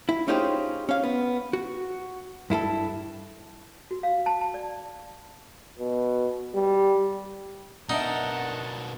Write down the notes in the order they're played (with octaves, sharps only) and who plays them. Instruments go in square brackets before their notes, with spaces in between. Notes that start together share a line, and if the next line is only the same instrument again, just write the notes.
[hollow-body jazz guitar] E4
C#4 D#4 F4 G4 G#4 C5
C#4 F5
B3
F#4
G2 E4 G#4 A4
[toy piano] F#4
F5
A5
A5
D5
[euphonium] B2
G3
[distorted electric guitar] B2 A#4 [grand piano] D4 D#5 E5 [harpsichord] D#4 [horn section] F#5 A5